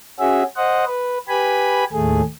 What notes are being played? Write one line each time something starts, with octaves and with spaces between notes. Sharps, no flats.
C#4 F#4 G#4 E5
C5 D#5 F#5
B4
G4 B4 G#5 B5
D#2 A2 A3 G#4